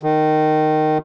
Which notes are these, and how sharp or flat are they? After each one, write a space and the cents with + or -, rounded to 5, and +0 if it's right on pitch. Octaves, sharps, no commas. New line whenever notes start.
D#3 -15